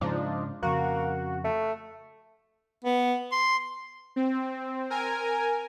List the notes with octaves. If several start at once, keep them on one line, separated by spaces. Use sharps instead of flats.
G#2 C#3 F3 G#3 D4 D#4
F2 C#3 A#3 F#4
A3
B3
C6
C4
A#4 G#5